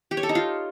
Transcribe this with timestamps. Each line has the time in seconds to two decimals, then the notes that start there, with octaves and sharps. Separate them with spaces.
0.11 G4
0.17 C#5
0.23 A4
0.29 D#4
0.35 F4